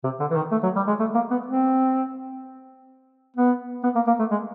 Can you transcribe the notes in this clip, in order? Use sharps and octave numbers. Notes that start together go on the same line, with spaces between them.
C3
D3
E3
D#3
A3
F#3
G3
G#3
A3
A#3
B3
C4
B3
B3
A#3
A#3
A3
G#3